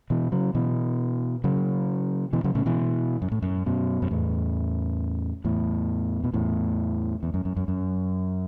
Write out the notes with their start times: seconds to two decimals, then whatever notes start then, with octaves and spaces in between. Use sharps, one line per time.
0.10 B2 E3
0.32 C#3 F#3
0.55 B2 E3
1.44 C#3 F#3
2.33 B2 E3
2.44 C#3 F#3
2.55 A2 C#3
2.66 B2 E3
3.22 F#2
3.32 A2
3.42 F#2
3.66 F#2 B2
4.02 F#2
4.11 E2 A2
5.45 E2 A2
6.24 B2
6.34 E2 A2
7.23 E2
7.34 F#2
7.45 F#2
7.57 F#2
7.68 F#2